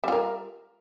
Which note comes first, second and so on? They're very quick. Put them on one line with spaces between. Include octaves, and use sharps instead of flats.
G3 F4 A#4